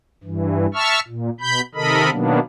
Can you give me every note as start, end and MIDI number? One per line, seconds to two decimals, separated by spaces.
0.24 0.66 43
0.24 0.66 52
0.74 1.00 76
0.74 1.00 81
0.74 1.00 85
0.74 1.00 88
0.74 1.00 89
1.08 1.30 46
1.40 1.61 47
1.40 1.61 83
1.40 1.61 91
1.75 2.10 48
1.75 2.10 51
1.75 2.10 69
1.75 2.10 70
1.75 2.10 75
1.75 2.10 83
2.11 2.39 47
2.11 2.39 51
2.11 2.39 54
2.11 2.39 58
2.11 2.39 59
2.11 2.39 62